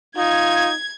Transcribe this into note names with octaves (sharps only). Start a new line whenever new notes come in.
D#4 F4 G#6